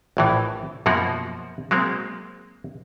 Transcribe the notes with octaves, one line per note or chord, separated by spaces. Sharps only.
A#1 A2 E3
F#2 B2 F3 A#3 F#4
F#3 G#3 A#3 C4